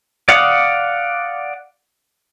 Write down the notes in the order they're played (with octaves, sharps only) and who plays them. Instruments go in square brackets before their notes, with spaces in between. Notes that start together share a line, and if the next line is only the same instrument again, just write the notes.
[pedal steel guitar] D5 F5 F#5 D6 D#6